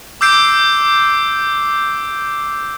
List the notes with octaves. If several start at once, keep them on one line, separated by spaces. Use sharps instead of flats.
D6 E6 G6 C7 D7